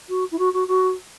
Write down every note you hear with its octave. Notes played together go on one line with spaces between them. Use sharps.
F#4
E4
F#4
F#4
F#4